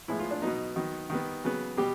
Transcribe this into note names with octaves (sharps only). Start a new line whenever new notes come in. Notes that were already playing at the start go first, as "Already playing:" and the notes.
A2 F3 G#3 B3 E4
F4
D4
B2 F#3 B3 D#4
D#3 F#3 B3
D#3 G3 B3
C#3 F#3 B3
B2 G3 G4